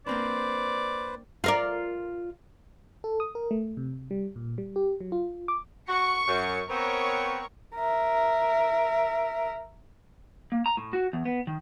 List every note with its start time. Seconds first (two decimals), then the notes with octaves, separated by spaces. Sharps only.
0.07 A#3 C4 D4 B4 C5 D5
1.44 F4 A#4 D5
3.04 A4
3.20 D#6
3.35 A#4
3.51 A3
3.77 C3
4.11 G3
4.36 A#2
4.58 G3
4.76 G4
5.01 F#3
5.12 F4
5.48 D6
5.89 F#4 C#6 C#7
6.28 F#2
6.70 B3 C4 A#4 C#5 C#6
7.75 A#4 E5
10.52 A#3
10.66 A#5
10.77 A2
10.93 F#4
11.13 E2
11.25 B3
11.47 D#3